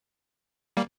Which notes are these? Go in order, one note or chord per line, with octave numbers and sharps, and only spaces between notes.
G3 A#3